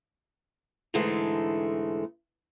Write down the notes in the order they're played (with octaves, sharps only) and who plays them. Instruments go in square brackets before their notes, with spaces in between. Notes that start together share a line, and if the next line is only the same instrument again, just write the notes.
[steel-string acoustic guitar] G#2 D3 E3 G#3 A3